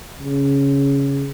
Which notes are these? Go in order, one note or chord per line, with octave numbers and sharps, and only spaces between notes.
C#3